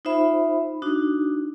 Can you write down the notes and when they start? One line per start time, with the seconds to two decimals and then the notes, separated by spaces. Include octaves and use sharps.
0.05 D#4 F4 C5 E5 B5
0.82 D4 D#4 F#4